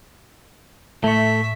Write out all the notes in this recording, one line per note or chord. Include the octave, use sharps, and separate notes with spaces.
A2 A3 E5 C#6